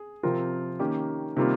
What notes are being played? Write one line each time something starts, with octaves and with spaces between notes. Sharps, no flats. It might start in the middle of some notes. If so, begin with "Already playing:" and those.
Already playing: G#4
C3 F3 C4 F4 A#4
D#3 A#3 C#4 G4
C3 D#3 G3 A#3 F4